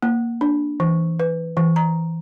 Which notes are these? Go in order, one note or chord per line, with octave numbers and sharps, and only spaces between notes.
A#3
D4
E3
B4
E3
A#5